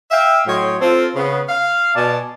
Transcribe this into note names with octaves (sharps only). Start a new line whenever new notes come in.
E5 F5 G5
A2 F#3 C#5 D#5 G5 C6
C4 F4 A4
C#3 B3
F5
B2 D5 G#5 A5